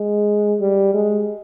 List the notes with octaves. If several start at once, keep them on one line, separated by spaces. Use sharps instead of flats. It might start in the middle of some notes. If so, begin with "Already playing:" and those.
Already playing: G#3
G3
G#3